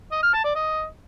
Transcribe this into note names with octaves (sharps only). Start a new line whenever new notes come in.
D#5
F6
A5
D5
D#5